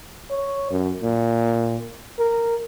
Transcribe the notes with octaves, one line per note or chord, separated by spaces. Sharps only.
C#5
F#2
A#2
A#4